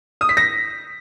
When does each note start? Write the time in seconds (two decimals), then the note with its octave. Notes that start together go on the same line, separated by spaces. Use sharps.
0.21 D#6
0.29 B6
0.37 A#6